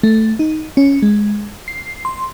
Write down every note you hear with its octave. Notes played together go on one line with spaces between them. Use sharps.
A3
D#4
C#4
G#3
C7
C6